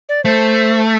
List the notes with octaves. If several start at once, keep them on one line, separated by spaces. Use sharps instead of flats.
D5
A3 C5